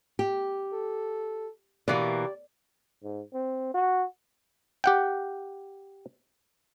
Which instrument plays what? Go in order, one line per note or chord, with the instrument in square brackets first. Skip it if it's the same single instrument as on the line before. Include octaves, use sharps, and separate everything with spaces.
[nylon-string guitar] G4
[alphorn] A4
[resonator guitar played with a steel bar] B2 E3 A#3 [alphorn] G4 [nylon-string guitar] D5
[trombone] G#2
C4
F#4
[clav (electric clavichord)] G4 F#5 G5